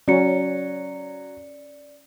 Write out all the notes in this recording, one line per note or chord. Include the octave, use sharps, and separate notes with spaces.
F#3 C#4 D5 C#7